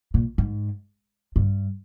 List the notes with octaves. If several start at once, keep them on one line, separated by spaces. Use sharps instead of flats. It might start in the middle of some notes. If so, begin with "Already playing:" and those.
A#2
G#2
G2